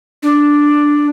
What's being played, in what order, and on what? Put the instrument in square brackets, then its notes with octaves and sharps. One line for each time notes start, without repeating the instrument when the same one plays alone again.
[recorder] D4